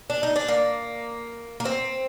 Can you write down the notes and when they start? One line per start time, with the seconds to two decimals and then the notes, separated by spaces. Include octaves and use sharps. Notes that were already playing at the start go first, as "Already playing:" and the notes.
0.10 D4
0.23 D#4
0.36 D4
0.48 A#3
1.60 A#3
1.65 C4